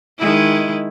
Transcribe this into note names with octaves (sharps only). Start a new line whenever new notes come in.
D#3 G#3 E4